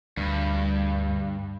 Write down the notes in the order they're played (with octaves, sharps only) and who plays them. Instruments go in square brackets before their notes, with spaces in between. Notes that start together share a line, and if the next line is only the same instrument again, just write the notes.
[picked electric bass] D2 [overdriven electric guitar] G2